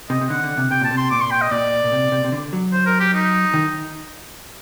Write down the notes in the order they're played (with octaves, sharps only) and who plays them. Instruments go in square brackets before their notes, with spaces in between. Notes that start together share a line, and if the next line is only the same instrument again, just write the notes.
[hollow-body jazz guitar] C3 [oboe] D#5
[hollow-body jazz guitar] C3
[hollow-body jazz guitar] D3 [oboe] F#5
[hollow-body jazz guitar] D3
C3
[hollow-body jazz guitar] C3 [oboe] G5
[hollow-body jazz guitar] A#2 [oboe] A5
[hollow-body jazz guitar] C3
[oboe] C6
[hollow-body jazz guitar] A#2 [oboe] D6
[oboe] C6
G5
D#5
[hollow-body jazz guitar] A#2 [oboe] D5
[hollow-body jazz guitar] A#2
C3
C3
C3
D3
F#3
[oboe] C5
A#4
G4
D#4
[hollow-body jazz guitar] D#3